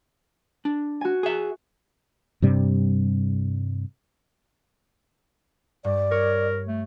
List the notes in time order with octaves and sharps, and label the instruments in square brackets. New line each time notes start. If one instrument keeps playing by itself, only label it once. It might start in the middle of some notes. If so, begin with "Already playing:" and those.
[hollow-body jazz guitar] D4
[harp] F#4 G#5
[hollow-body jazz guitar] G#4 E5
[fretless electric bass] G2 C3 G3
[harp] G2 [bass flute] D5
[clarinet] A#4 [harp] C#5
[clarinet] A3